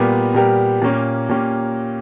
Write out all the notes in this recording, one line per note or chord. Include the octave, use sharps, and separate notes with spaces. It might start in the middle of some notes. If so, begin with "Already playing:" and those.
Already playing: A#2 G3 B3 G4 A#4
A#2 G3 B3 G4 A#4
A#2 A#3 C#4 G4
A#2 A#3 C#4 G4